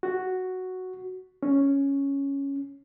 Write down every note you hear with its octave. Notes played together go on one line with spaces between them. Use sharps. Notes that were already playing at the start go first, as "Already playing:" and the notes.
F#4
C#4